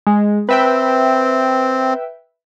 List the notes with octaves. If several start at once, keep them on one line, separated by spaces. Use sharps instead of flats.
G#3
C4 B4 E5 G5